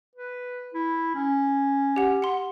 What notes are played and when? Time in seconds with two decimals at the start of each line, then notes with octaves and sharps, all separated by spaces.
0.16 B4
0.74 E4
1.15 C#4
1.96 G4 F#5
2.22 F#5 C6